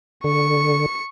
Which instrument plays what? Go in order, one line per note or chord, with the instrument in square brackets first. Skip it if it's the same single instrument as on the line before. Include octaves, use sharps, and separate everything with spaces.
[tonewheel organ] D3 [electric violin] C#6 C#7